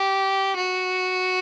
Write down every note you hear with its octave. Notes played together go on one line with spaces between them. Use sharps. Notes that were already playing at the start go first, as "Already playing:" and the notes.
Already playing: G4
F#4